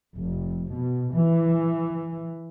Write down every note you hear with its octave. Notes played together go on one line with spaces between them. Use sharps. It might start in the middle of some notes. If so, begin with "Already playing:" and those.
F1
B2
E3